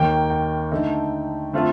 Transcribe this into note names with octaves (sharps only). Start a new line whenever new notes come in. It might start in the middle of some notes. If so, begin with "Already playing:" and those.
Already playing: D#2 D#3 A#3 G5
G5
D3 A3 D#4
D3 A3 C4 F4